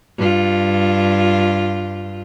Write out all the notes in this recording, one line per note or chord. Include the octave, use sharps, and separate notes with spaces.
G2 F4